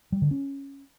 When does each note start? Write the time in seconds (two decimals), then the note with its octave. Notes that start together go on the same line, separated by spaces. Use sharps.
0.12 G3
0.22 D3
0.31 C#4